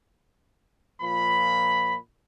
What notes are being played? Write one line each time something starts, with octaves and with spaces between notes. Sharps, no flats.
A#2 F3 B5